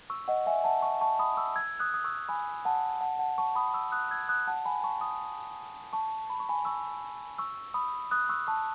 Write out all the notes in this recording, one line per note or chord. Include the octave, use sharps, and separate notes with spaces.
C#6 E6
D#5 F#5
E5 G#5
F#5 A5
A5 C#6
A5 C#6
B5 D#6
C#6 E6
E6 G#6
D#6 F#6
D#6
C#6 E6
G#5 B5
F#5 A5
F#5 A5
F#5 A5
A5 C#6
B5 D#6
C#6 E6
D#6 F#6
E6 G#6
D#6 F#6
F#5 A5
G#5 B5
A5 C#6
B5 D#6
A5 C#6
B5
C#6
G#5 B5
C#6 E6
C#6 E6
B5 D#6
D#6 F#6
C#6 E6
A5 C#6